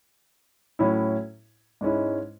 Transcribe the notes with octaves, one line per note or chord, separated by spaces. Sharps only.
A2 F#3 C#4 E4
G#2 G#3 C#4 E4